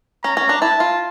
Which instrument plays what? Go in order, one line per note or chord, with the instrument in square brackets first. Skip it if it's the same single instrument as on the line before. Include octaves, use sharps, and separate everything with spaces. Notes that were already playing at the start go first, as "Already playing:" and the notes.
[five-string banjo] C#4 [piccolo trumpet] A#5
[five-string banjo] C#4
D4
[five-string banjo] E4 [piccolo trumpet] A5
[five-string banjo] F4